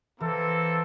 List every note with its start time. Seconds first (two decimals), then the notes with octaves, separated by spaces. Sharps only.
0.21 E3 A#3 C4 A4